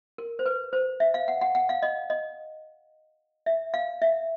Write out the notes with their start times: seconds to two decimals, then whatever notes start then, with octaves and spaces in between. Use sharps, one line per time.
0.18 A#4
0.39 C5
0.46 B4
0.73 C5
1.00 E5
1.14 F5
1.28 F#5
1.41 F#5
1.55 F#5
1.69 F5
1.83 D#5
2.10 D#5
3.46 E5
3.74 F5
4.02 E5